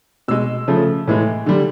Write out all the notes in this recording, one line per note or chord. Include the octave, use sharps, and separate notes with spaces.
B2 G#3 E6
C#3 F3 A3
A2 E3 G#3
D3 G3